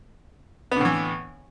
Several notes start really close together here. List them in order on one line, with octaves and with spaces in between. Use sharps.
B3 D3 A2 E3